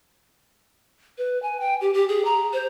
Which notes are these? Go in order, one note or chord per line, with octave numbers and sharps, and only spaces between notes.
B4
G#5
G5
G4
G4
G#4
A#5
C5